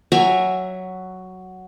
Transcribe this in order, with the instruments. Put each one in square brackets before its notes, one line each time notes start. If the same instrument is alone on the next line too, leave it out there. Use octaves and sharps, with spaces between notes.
[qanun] F#3 E5 G#5 A#5